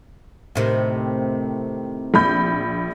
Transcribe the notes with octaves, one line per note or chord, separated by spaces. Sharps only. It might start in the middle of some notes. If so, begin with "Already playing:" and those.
A2 C3 D#3
A#1 B5 G6